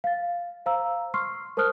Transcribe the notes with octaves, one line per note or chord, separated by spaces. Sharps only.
F5 A6
C5 F5 A#5 E6
C6 C#6 E6 F6 C7
A#4 C5 A5 D#6 F6 F#6